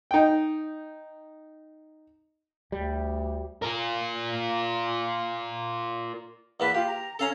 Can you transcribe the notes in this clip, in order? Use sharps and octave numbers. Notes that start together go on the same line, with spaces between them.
D#4 G5
D2 G3
F4 A#4
E2 A#3 B4 A5
F4 G4
A#5
C#4 A4 F5 A#5